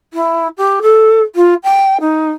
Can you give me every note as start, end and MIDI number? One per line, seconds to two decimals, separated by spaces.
0.13 0.48 64
0.58 0.80 67
0.82 1.21 69
1.35 1.54 65
1.63 1.97 79
2.01 2.31 63